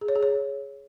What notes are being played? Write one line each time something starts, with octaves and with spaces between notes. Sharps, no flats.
G#4
C#5
G#4
C#5